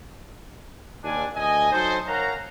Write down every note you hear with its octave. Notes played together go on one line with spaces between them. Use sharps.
D#2 D4 G#5
D2 D#5 G#5
F#3 D#4 A4 C5
A#4 C#5 F5 F#5 A#5